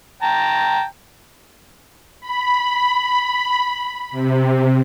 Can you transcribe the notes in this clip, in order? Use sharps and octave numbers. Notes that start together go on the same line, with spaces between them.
G5 A5 A#5
B5
C3